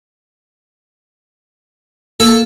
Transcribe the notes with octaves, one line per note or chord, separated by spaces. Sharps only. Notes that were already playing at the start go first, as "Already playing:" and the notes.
A#3 A4